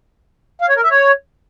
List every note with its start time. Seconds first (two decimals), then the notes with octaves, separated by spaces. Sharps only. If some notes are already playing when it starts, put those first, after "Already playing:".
0.61 F5
0.69 C#5
0.76 A#4
0.83 E5
0.90 C#5